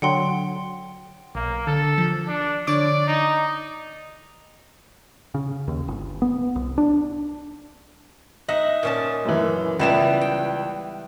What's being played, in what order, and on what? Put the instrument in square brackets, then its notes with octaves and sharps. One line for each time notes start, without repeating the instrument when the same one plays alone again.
[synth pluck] D3 F#3 [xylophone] F#5 G5 C6
[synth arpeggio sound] B1 [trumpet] A#3
[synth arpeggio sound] D3 [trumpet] A4
[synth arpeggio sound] F3
[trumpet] D4
[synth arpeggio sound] D3 C#5 D6 [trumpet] D5
[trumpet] D#4
[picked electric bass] C#3
D#2
G1
B3
C2
D4
[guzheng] D#4 E5 F#5 [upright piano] D#5
[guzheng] A#2 C#4 A5
[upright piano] F#2 E3
[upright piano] C#2 E7 [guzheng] E3 G3 B3
[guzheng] G5